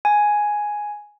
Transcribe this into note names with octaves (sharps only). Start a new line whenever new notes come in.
G#5